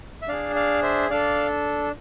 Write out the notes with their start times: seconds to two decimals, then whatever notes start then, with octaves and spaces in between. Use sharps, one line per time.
0.22 E5
0.28 D4 G#4 D5 F5
0.56 D5 F5
0.83 C5 E5
1.10 D4 A4 D5 F5